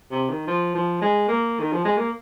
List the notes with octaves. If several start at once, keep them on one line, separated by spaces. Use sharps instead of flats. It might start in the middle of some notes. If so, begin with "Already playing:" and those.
C3
D#3
F3
F3
G#3
A#3
D#3
F3
G#3
A#3